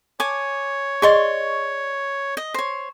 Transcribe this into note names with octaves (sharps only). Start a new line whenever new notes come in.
C#5 G#5 D6
G#4 D5 D#5 C6 C#6
D#5
C5 C#5